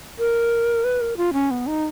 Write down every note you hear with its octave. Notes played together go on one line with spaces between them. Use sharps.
A#4
B4
A#4
F4
C#4
B3
D#4